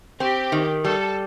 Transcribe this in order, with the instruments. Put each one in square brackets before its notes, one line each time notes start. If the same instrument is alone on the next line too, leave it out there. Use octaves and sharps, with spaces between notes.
[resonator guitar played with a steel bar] C4 [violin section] G4
[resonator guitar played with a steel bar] D#3
[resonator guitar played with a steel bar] G3 [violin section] A4